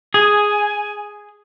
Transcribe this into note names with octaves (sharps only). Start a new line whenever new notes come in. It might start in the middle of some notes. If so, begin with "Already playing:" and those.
G#4 G#5